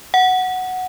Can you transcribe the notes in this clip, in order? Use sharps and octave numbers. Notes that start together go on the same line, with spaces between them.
F#5